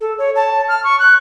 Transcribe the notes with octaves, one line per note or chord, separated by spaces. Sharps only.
A4
C#5
A5
F6
C#6
F#6